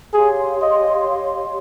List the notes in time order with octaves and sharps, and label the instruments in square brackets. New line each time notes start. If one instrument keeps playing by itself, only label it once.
[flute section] G4 C#5 F5 C6 [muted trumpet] G#4
[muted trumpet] D#5